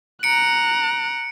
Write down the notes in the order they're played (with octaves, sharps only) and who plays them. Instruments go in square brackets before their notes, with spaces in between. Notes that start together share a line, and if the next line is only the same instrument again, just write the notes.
[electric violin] A#5 F#6 [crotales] C#7 D7